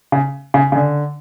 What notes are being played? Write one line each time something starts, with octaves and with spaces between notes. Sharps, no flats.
C#3
C#3
C#3
D3